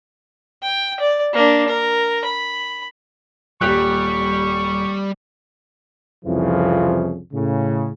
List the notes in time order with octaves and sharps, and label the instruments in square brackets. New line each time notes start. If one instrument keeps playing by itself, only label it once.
[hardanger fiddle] G5
D5
A#3 D4
A#4
B5
[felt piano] D#1 G4 F#6 [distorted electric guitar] G3 [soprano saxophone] C#6
[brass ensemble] C2 F2 C#3 E3 F3
A2 C#3